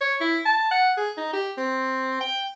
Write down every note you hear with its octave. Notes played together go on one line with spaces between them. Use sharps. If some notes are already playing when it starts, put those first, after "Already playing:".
C#5
E4
A5
F#5
G#4
D#4
G4
C4
G5